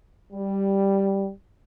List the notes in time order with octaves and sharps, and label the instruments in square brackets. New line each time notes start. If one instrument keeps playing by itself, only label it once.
[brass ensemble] G3